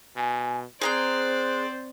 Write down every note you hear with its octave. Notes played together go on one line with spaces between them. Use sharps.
B2 G#5
C4 G#4 C5 D5 A#5 F#6 G6